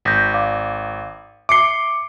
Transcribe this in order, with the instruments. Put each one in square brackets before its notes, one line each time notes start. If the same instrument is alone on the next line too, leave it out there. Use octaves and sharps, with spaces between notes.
[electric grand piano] G#1 [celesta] G6 A#6 B6
[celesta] D5 F5 D6
[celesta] E5 C#7 G7 [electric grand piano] D6 C7